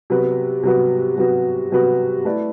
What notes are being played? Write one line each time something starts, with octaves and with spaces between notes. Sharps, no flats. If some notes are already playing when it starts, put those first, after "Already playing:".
C3 F#3 B3 F#4 B4
C3 F#3 B3 F#4 B4
C3 F#3 B3 F#4 B4
C3 F#3 B3 F#4 B4
A3 E4 B4 D5